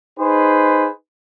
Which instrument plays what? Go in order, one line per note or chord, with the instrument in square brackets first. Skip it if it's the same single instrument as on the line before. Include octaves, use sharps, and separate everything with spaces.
[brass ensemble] D#4 G#4 B4 C5